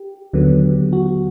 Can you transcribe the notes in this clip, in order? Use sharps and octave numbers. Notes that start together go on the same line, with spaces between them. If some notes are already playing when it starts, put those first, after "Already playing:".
Already playing: G4
D#2 D3 F#3 B3
F#4